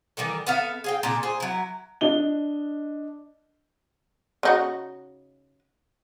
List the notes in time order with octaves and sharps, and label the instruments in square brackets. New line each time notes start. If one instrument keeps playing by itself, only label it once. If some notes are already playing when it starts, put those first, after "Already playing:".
[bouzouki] D#3 E3 G3 A3
B3 A4 E5 F5
G#4 F5 G5
A#2 C#3 D4
G#4 C5
F#3 E4
[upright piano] D4 D#5 G7
[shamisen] C#3 D#4 F#4